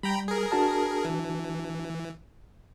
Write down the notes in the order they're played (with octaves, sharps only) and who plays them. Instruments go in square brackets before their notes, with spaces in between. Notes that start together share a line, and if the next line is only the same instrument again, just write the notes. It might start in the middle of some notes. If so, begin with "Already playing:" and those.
[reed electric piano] G3 [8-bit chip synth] G5 A#5 B5
[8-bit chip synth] G#4 A#4
[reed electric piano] D4 F#4 A5
[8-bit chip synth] E3